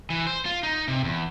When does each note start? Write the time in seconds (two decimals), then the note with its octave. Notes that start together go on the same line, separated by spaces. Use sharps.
0.10 E3
0.27 C5
0.46 F4
0.63 D#4
0.88 C3
1.04 E2